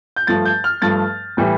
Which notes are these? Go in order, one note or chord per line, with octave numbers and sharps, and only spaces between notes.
G6
G2 F3 A3 A6
G6
F6
G2 F3 A3 A6
A2 E3 G3